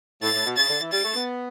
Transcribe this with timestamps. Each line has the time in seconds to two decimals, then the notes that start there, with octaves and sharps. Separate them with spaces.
0.22 A2 A6
0.34 A2
0.46 B2
0.57 C#3 A6
0.69 D3
0.81 E3
0.92 G3 A6
1.04 A3
1.15 B3